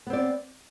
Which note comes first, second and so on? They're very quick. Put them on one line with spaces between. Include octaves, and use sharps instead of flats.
B3 C4 D5